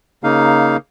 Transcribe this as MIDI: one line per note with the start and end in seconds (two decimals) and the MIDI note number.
0.24 0.77 49
0.24 0.77 58
0.24 0.77 63
0.24 0.77 77